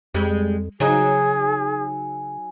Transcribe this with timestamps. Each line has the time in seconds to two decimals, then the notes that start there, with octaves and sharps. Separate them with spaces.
0.14 F2 G3 G#3
0.80 C#3 F#3 D#4 G#4 G#5